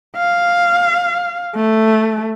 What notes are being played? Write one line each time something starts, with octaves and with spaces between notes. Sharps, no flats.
F5
A3